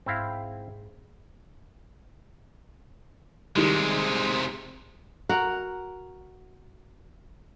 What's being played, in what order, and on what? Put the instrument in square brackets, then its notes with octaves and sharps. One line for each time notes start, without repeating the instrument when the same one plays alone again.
[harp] G#2 [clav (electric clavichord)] C4 E4 F5
[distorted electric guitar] C3 G#3 [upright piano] D#3 G3
[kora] F#4 A#4 F#5